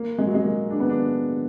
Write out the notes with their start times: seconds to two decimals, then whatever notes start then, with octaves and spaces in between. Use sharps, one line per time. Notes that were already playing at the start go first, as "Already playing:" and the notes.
Already playing: A#3
0.18 G#3
0.26 F#3
0.34 G#3
0.44 A#3
0.70 D4
0.80 B3
0.90 D4